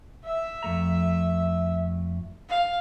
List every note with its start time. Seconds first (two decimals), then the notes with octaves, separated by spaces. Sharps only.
0.25 E5
0.63 F2 A3 A#5
2.50 F5